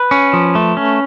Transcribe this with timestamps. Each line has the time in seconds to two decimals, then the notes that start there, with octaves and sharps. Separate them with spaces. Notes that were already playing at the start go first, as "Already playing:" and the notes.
Already playing: B4
0.11 C#4
0.33 F3
0.55 A3
0.77 C#4